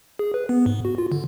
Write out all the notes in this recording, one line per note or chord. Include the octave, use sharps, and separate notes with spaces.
G#4
B4
B3
G#2
F#4
F4
D3